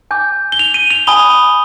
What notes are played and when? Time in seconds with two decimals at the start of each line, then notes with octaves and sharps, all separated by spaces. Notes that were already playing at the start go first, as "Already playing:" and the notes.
0.11 G#5 D6 G6
0.52 G7
0.59 F7
0.74 D#7
0.90 F7
1.07 G#5 B5 D#6 G7